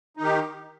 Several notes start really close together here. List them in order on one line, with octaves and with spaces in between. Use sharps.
D#4 D#3 G4